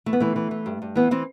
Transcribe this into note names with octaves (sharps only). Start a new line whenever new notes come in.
E3 A3
B3
E3 A3
E3
E3
G2
G2
E3 B3
E3 C4